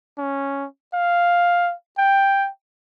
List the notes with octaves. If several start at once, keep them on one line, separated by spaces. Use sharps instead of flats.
C#4
F5
G5